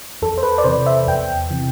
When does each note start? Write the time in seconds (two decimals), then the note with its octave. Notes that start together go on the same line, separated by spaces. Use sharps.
0.22 E2 A4
0.38 C5
0.43 B4
0.58 D5
0.64 C3 E3 C5
0.86 E5
1.08 E2 G5
1.51 C3 E3